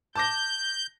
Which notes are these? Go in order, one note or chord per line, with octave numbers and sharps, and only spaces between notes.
A5 D6 G6 A#6